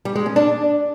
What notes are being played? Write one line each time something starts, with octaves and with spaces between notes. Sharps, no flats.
G3
G#3
C#4
D4